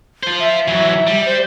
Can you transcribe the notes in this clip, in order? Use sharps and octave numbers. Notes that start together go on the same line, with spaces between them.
F4 C5
E5
E3 F#3
G3
C5